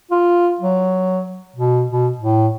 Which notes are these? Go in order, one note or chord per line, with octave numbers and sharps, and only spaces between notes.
F4
F#3
B2
B2
A2